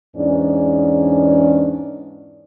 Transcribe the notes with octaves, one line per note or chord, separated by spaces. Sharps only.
E2 G#2 C#4 D4 D5